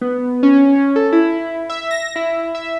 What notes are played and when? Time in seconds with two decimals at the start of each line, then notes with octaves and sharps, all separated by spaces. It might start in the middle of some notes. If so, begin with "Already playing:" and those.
0.01 B3
0.43 C#4
0.75 C#4
0.96 A4
1.12 E4
1.70 E5
1.91 A#6
2.16 E4
2.55 E5